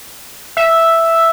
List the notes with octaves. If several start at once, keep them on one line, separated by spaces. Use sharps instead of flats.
E5